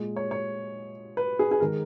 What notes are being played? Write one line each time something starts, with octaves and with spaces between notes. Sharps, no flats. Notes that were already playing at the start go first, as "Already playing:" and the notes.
Already playing: A#2 G#3
C#5
C#5
B4
G#4
G#4
D#3 G#3 A#4